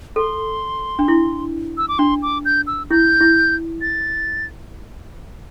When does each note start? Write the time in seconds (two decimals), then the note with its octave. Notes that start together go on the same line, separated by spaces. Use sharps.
0.16 A4 C6
0.99 D4
1.08 E4
1.77 E6
1.88 D6
1.99 D4 C6
2.22 D6
2.45 G6
2.67 E6
2.91 E4 G6
3.21 E4
3.81 A6